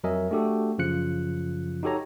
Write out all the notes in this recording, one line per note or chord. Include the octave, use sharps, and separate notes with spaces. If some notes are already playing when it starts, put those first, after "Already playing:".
F2 F#3 A#4 D#5 E5 G#5
A3 D4 F#4 G4 A4
F#2 C#3 F3 F4 F#6 C#7
D#4 F#4 G4 A4 C#5 A#5